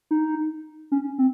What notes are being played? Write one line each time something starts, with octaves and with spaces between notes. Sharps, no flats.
D#4
C#4
C4